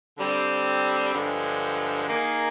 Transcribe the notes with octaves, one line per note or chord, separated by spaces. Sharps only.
D3 G3 C4
G2 D3 F3 G#3
D#3 A#3 D#4 G#4